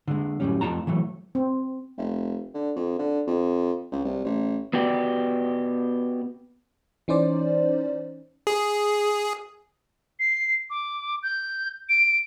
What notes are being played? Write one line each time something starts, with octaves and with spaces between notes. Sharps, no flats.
D3 G#3
F#2 A2 C3 G3 C#4
F2 A3 B3 F4 A5 A#5
E3 F#3 A3
C4
F1
D3
F2
D3
F2
C#2
C2
A1
B3 F#4 G4 D5
E3 C#4 D#4 C5 D5
G#4
C7
D6
G6
D7